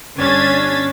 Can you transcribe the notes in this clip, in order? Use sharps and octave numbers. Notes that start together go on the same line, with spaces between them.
G1 C#4 D4 G#6 A6 B6